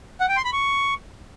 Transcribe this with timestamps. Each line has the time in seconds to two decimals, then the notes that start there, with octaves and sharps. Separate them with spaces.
0.21 F#5
0.29 G5
0.37 C6
0.45 B5
0.53 C#6